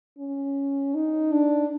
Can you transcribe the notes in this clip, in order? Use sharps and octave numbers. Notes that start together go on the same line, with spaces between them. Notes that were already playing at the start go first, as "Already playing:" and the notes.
C#4
D#4
D4